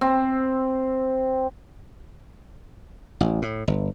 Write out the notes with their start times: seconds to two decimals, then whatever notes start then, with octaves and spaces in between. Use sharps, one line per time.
0.01 C4
3.21 A1
3.42 A2
3.68 G1